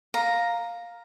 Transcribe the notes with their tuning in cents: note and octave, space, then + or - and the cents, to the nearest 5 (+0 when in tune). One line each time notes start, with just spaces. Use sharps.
F5 +10 A#5 +0